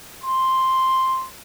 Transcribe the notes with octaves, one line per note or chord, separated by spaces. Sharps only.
C6